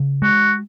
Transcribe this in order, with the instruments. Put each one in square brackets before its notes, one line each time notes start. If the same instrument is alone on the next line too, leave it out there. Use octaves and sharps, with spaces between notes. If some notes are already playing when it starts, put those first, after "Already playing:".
Already playing: [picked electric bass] C#3
[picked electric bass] G#3 [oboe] F#4